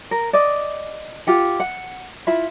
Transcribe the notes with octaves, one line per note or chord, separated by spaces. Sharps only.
A#4
D5 D#5
F4 G4 F#5
F#5
E4 F4 E5 B5